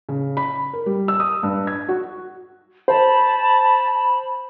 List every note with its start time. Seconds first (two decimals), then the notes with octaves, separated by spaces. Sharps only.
0.09 C#3
0.37 B5
0.73 A#4
0.86 G3
1.08 E6
1.20 D#6
1.43 G2
1.67 G#6
1.89 F#4
2.88 C5 A5 B5